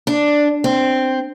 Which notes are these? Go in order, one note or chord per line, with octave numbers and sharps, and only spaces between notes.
D4
C4